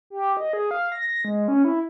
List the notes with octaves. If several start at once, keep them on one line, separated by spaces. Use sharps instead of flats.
G4
D#5
G#4
F5
A#6
A#6
G#3
C#4
E4